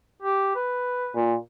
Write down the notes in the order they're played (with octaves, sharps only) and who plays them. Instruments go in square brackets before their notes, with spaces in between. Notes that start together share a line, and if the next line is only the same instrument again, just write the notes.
[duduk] G4
B4
[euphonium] A#2